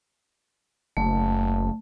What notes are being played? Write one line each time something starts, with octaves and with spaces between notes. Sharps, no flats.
F#1 A3